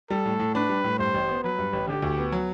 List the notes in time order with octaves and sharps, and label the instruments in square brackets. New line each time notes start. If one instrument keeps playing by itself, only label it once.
[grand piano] G3 [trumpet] A4
[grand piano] A2
A2
[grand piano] D4 [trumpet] B4
[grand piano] G3
A2
[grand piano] G2 [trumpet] C5
[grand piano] A1
B3
[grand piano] F#3 [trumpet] B4
[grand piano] G2
A1
[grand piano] D3 [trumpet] G4
[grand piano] D2
B3
F#3